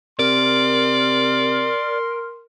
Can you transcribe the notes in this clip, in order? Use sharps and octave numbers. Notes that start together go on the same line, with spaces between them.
C3 A#4 D5 C6